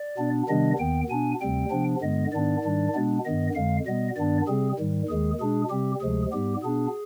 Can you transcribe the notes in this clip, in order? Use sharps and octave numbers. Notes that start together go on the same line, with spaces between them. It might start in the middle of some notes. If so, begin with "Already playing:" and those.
Already playing: D5
B2 B3 D4
C3 D#3 G3 B3 D4 D#5
D#2 D#3 B3 G5
B2 B3 D4 G#5
D2 C3 G3 C4 G5
C3 F3 B3 D4
G2 D3 G#3 B3 D#5
G#2 D#3 B3 D4 D5
G#2 D#3 G3 D4
B2 G#3 B3 D4
G2 D#3 B3 D#5
F2 D3 G#3 F5
B2 G3 B3 D#5
G2 D#3 B3 D4 D5
C3 G3 C4 G#4
G#2 D#3 G3
D#2 D#3 G#3 G#4
B2 G#3 D4 G#4
C3 G3 C4 G4
D2 C3 F3 G#3 G#4
G#2 G3 B3 G4
B2 B3 D4 G#4